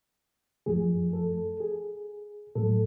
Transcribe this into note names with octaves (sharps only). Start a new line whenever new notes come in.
F#2 F3 A3 G#4
A4
G#4
A2 F#3 A3 A4